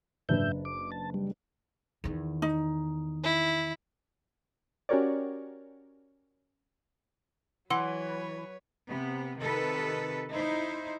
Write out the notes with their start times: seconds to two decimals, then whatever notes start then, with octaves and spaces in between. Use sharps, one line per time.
0.29 F#1 G#2 D4 B4 E5 G6
0.65 D6
0.92 A5
1.14 G3
2.04 E2 D#3
2.42 D#4
3.24 E4
4.89 C#4 F#4 G4 A#4 C#5 D5
7.70 E3 F#3 B4 C#5 F#5 C6 E6
8.88 C3 B3
9.38 C3 D#3 A4 B4
10.31 D#4 E4 C5